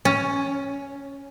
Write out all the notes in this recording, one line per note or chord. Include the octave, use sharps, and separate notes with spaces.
C#4